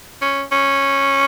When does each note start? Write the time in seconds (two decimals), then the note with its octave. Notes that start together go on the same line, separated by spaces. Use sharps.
0.22 C#4
0.52 C#4